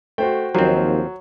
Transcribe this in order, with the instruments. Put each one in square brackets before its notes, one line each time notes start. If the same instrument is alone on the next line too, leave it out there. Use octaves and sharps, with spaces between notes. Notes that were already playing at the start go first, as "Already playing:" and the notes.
[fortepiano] A3 [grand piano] F#4 C5 G5
[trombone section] D#2 [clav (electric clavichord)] F3 C4 [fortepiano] F#3